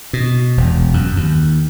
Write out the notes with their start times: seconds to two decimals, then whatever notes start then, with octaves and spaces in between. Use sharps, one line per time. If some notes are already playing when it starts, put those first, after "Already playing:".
0.13 B2
0.57 E1
0.93 F#2
1.16 D#2